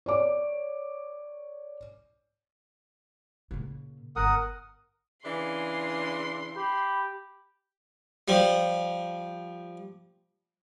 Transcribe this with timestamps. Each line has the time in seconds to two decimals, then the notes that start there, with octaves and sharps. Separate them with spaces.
0.06 C#5 D5 D6
3.51 A#2 C#3
4.16 G1 D3 A#4 F#5 D#6
5.24 C#3 E3 D4 C6
6.56 G4 B5
8.28 F3 G3